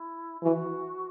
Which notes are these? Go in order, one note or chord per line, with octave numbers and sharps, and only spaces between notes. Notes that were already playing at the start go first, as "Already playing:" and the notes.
Already playing: E4
E3 F#4